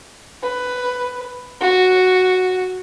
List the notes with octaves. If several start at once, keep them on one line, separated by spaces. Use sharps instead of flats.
B4
F#4